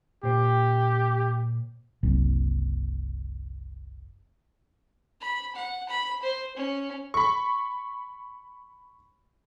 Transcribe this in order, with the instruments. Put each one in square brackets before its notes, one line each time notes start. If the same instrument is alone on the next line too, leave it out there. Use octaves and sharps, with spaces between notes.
[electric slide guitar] A#2 C5 G5 [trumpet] G4
[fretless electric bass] F#1 C2
[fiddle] B5
F#5
B5
C5
C#4
[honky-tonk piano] B5 C#6